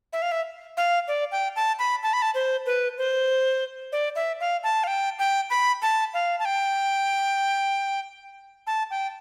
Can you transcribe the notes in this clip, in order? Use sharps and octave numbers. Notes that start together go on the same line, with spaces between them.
E5
F5
E5
F5
D5
G5
A5
B5
A5
B5
A5
C5
B4
C5
D5
E5
F5
A5
F5
G5
G5
B5
A5
F5
A5
G5
A5
G5